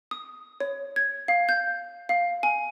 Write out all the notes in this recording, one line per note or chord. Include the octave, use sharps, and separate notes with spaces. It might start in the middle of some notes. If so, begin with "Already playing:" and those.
D#6
C#5
G#6
F5
G6
F5
G#5